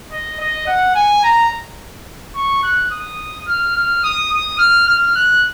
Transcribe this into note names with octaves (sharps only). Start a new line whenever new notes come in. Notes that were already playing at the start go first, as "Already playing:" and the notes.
D#5
D#5
F#5
G#5
A#5
C#6
F#6
D#6
F6
F6
D#6
D#6
F6
F6
F#6